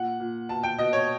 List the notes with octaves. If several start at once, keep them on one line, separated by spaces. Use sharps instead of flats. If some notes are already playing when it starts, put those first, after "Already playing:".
Already playing: A#2 F#5
A#2
B2 A5
G5
B2 D#5
C#5